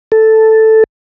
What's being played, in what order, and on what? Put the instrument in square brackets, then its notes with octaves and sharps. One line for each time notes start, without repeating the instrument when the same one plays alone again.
[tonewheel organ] A4